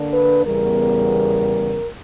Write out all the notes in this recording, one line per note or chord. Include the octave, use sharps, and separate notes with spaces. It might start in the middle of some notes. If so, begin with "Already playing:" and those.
Already playing: D3 A#3 D4
B4
E2 C#3 G3 B3 A#4